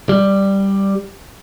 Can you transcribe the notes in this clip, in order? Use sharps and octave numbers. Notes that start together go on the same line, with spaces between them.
G3